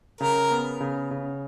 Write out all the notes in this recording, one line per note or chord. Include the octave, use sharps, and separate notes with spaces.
C#3 A#4
B3
C#3
C#3